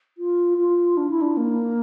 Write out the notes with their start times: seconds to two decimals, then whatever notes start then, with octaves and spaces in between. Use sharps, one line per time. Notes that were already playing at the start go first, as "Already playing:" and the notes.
0.18 F4
0.58 F4
0.97 D4
1.10 E4
1.21 D4
1.37 A#3